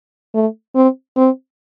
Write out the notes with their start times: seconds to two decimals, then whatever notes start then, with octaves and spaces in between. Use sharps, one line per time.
0.34 A3
0.75 C4
1.16 C4